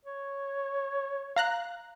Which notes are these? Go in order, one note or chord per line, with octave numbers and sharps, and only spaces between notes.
C#5
F5 A#5 F#6